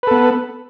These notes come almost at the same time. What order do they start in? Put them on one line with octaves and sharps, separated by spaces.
B4 A4 B3